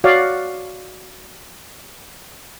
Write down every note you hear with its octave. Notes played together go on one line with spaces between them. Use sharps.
F#4 C#5 D5 F5